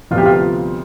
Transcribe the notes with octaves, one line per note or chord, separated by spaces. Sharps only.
D2 C3 F3 B3 F4
G4
F4